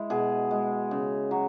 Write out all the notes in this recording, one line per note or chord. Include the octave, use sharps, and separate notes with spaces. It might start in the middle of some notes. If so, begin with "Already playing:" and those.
Already playing: G#3 E4
B2 G#4
G#3
C#3
F#3